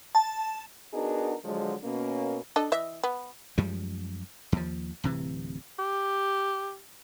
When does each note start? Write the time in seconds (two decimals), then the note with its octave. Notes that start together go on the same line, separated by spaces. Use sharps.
0.15 A5
0.93 B3 D4 D#4 F#4 G#4 A#4
1.44 D3 F3 F#3 G#3
1.84 B2 A#3 C#4
2.56 D4 A4 D#5
2.72 E3 D#5 E5
3.04 B3
3.58 F#2 F3 G3 G#3
4.52 D#2 F3
5.04 D1 C3 E3
5.79 G4